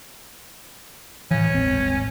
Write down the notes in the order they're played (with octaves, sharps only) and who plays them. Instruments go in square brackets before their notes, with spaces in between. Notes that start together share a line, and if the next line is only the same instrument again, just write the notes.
[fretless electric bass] A2 E3 [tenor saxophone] C#4
[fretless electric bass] D#1 G#1 C4